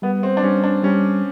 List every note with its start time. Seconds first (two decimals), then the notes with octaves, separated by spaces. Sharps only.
0.02 G3 B3
0.23 C4
0.37 D4
0.43 G3 C#4
0.64 D4
0.83 G3 C#4